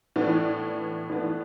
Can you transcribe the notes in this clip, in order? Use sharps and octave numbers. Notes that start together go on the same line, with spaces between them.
A2 E3 B3 D4
A2 E3 B3 D4